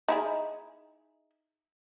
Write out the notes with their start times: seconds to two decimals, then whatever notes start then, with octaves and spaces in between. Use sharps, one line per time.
0.08 D#4 E4 G#4